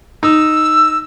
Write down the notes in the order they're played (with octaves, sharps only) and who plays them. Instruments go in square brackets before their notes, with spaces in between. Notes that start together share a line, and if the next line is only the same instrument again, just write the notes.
[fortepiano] D#4 [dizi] E6